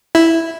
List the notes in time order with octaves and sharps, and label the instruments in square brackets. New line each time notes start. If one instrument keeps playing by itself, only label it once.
[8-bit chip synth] E4